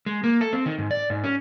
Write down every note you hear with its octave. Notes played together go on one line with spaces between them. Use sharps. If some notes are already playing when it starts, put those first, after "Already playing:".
G#3
A#3
A4
C4
D#3
G#2
D5
G#2
C#4